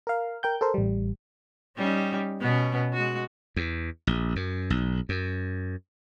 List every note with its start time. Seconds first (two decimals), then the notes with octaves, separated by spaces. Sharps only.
0.07 A#4 F5
0.43 A#4 G5 G6
0.61 A4 A#4 C5
0.74 A1 G3
1.77 G3 C#4 D#4
2.40 B2 B3 C#4
2.93 G#3 F#4
3.56 E2
4.07 A#1
4.36 F#2
4.70 B1
5.09 F#2